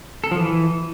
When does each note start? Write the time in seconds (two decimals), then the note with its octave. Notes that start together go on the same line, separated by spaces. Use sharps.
0.24 A4
0.31 F3
0.39 E3